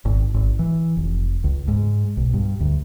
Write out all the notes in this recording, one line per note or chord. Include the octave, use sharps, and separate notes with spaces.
G#1
G#1
E3
F1
C#2
G#2
B1
G2
D2